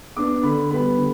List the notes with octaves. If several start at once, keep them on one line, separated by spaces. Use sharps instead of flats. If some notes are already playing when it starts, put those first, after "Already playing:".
B3 D4 D6
D3 B5
G3 B3 B5
D3